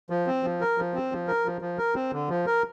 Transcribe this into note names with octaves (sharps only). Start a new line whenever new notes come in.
F3
C4
F3
A#4
F3
C4
F3
A#4
F3
F3
A#4
C4
D3
F3
A#4